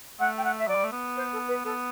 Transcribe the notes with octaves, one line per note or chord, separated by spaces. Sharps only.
A3 F#5
G5
F#5
E5
F#3 D5
G3
A3
B3
C5
A4
B4
B3 A4